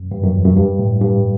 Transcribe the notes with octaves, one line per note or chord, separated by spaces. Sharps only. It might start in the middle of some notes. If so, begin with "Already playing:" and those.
Already playing: F#2
G2
F#2
E2
F#2
G2
A2
G2